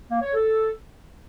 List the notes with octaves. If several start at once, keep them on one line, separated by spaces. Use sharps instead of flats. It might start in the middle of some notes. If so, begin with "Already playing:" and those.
A#3
C#5
A4